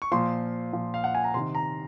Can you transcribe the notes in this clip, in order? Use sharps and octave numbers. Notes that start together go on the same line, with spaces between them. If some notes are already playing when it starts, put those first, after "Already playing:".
C#6
A#2 F3 C6
A#2 F3
F5
F#5
G#5
A#5
C3 D#3 C6
A#5